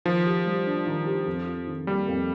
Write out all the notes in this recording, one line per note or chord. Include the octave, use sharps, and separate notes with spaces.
D#3 F3
G4
G3
D4
D#3
G4
F2
F4
D#3
G3 A#3
F2